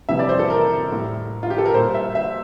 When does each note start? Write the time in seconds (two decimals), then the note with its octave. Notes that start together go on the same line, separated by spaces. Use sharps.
0.09 F2 C3 E3 G3 E5
0.19 D5
0.29 C5
0.39 A4
0.50 A#4
0.91 A2 G3
1.43 F4
1.50 G4
1.58 A4
1.66 A#4
1.73 A#2 G3 C5
1.94 E5
2.15 E5